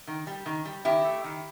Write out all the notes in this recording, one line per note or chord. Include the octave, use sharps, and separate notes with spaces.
D#3
G3
D#3
G3
D#3 E4 G4
A3
D#3